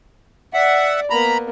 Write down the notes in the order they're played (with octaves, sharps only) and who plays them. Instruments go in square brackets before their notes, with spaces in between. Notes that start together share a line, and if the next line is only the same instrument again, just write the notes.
[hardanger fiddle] D5 [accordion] E5 F#5
[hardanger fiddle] A#3 B3 [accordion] A#5 B5